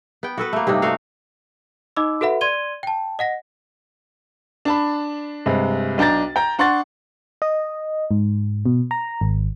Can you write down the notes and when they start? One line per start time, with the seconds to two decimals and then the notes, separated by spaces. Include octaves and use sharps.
0.23 B3 G5
0.38 F#4 A4 B4
0.53 A3 A#3
0.67 G2 C3 D4 D#4
0.82 A3 F#4 F5
1.96 D#4 D#5 B5 D6 E6
2.21 F#4 A4 B4 E5 F#5 B5
2.41 D5 C6 G#6 D#7 G7
2.83 G5 A5
3.19 D#5 F#5 A#6
4.65 D4 A5 B5
5.46 G2 C3 G#3
5.98 B1 D4 G5 A#5 A6
6.36 G5 A#5
6.59 D4 F#5 C6 C#6 A6
7.42 D#5
8.11 G#2
8.66 B2
8.91 A#5
9.21 G#1